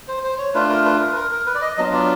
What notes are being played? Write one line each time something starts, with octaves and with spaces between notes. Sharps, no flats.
C5
C5
C#5
A3 D4 F4 B4
A#4
B4
A#4
B4
A#4
A#4
B4
D5
D#5
F#3 B3 D4 F4 D#5
D5